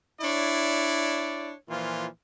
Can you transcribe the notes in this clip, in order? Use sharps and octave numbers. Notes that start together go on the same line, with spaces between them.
D4 E4 C#5 D5
A#2 E3 F3 F4